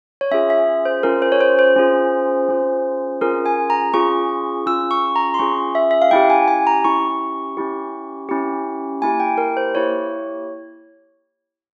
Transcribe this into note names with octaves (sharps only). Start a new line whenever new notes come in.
C#5
C#4 F4 G#4 E5
E5
C5
C#4 F4 G#4 A#4
C5
C#5
C5
C5
C#4 F4 G#4
C#4 F4 G#4
C#4 F4 G#4 A#4
G#5
A#5
C#4 F4 G#4 C#6
C#4 F4 G#4 E6
C#6
A#5
C6
C#4 F4 G#4 C#6
E5
E5
F5
C#4 E4 G4 G5
G#5
G#5
A#5
C#4 E4 G4 C#6
C#4 E4 G4
C#4 E4 G4
A#3 E4 G4 G#5
G5
A#4
C5
A#3 E4 G4 C#5